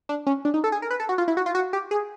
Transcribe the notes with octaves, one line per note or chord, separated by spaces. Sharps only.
D4
C#4
D4
D#4
A4
G#4
A#4
B4
A4
F#4
F4
E4
F#4
F4
F#4
G4
G#4